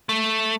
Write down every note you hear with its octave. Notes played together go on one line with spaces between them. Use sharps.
A3